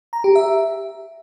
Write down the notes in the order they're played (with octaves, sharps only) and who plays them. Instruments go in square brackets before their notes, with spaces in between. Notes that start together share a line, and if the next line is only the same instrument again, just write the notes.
[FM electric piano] A#5
G4
E5